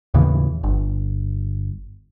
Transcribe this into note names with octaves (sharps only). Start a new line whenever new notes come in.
D#2 A2 C#3 E3
G1